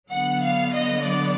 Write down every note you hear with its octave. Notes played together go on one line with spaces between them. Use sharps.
D3 F#3 B3 F#5
F5
D#5
D5